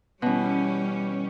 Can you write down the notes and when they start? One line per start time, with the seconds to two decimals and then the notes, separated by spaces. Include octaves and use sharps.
0.22 B2 E3 G3 C#4